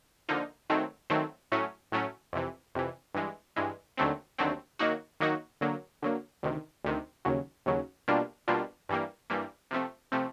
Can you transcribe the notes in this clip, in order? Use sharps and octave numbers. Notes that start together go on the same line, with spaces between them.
D3 F3 A#3 D#4
D#3 F#3 A3 C4
D#3 F#3 A3 C4
A2 F#3 A3 C#4
A2 F#3 A3 C#4
F2 C3 E3
F2 C3 E3
G2 E3 G#3
G2 E3 G#3
D#2 D3 F#3 A3 C4
D#2 D3 F#3 A3 C4
D#3 F#3 A#3 D#4 F#4
D#3 F#3 A#3 D#4 F#4
D3 F#3 A#3
D3 F#3 A#3
D2 C3 D#3
D2 C3 D#3
D#2 C#3 F#3
D#2 C#3 F#3
B2 G3 A#3 D4 F4
B2 G3 A#3 D4 F4
G2 E3 G3 A#3
G2 E3 G3 A#3
C3 F3 A3 C4
C3 F3 A3 C4